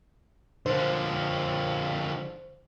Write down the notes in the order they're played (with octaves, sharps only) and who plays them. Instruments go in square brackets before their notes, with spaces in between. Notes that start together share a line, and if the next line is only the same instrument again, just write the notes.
[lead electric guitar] D3 F3 [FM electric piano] C5